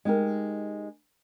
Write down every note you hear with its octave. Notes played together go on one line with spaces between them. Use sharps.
G#3 D#4 G4 A#4